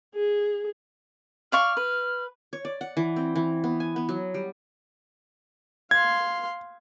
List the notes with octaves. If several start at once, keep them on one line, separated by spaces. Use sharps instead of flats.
G#4
D5 F5 C#6 F6
B4
C#5
D5
F#5
E3
C4
E3
B3
G#5
B3
F#3
G3
F5 C6 G#6